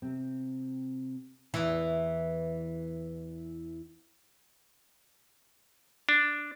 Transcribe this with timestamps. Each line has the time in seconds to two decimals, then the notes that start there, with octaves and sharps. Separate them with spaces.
0.02 C3 C4
1.54 E2 E3
6.09 D4